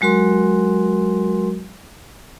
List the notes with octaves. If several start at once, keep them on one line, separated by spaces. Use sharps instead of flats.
F#3 G#3 F#4 A#4 C6